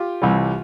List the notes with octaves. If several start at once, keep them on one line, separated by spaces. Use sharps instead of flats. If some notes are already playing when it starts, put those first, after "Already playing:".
Already playing: F4 G4
C2 C3 E3 G3